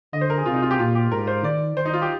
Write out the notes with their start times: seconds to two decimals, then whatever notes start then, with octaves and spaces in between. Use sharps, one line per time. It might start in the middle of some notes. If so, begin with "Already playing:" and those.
0.13 D3 D#5
0.21 C5
0.30 A#4
0.38 G#4
0.46 C3 F4
0.54 D#4
0.62 F4
0.71 G4
0.79 A#2 F4
0.95 G4
1.11 G#2 A#4
1.27 C5
1.44 D#3 D5
1.77 D#3 C5
1.85 D#4
1.93 F4
2.02 G4